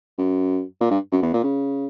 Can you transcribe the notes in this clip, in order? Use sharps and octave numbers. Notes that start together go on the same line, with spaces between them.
F#2
A#2
G2
F#2
E2
A#2
C#3